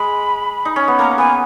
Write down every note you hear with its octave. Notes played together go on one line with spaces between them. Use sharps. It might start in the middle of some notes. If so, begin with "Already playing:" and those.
Already playing: G#3 B5
D#4
C#4
B3
A#3 A#5
B3 G#5